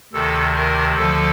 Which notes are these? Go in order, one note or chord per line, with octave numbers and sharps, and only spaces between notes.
D2 C3 D#3 A4
A#4
D2 D3 F3 A4